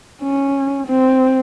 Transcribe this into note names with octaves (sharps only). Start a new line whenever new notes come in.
C#4
C4